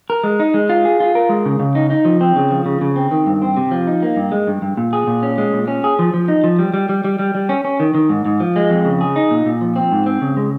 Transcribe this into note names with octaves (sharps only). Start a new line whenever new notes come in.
A#4
G#3
D#4
G#3
F4
G#4
F4
A#4
G#3
C#3
C#3
D#4
D#4
F3
C4
C#3
F3
C#3
C#3
C4
D#3
G2
C4
C3
F3
D#4
A#3
G2
G#3
G2
G2
A#2
G#4
A#2
C#4
G#3
A#2
C#4
G#4
F3
F3
D#4
F3
G3
G3
G3
G3
G3
G3
C#4
C#4
D#3
D#3
G#2
G#2
F3
G#3
F2
C#3
G#4
D#4
A#2
A#2
F3
C4
G#2
C4
C#3
G#3